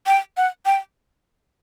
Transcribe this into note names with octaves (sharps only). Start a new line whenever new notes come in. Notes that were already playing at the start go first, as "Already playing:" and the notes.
G5
F#5
G5